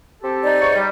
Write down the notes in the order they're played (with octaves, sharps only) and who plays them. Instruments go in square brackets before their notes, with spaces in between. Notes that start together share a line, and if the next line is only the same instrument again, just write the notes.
[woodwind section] C4 G4 A4
[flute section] D#4 D5
[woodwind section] G#2 C#5 C#6
G3